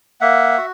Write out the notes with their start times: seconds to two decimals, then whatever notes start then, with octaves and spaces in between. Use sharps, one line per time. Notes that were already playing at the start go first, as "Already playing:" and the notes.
0.21 A#3 E5 F#5
0.58 F#4